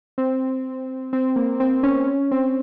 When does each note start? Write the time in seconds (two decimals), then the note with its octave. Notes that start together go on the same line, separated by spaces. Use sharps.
0.18 C4
1.13 C4
1.36 A#3
1.60 C4
1.83 C#4
2.07 C#4
2.31 C4